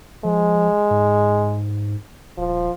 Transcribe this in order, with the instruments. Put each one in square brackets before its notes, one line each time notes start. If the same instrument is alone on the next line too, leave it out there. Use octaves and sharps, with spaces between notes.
[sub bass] F3 [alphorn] G#3
[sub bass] G#2
[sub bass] D#1 [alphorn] F3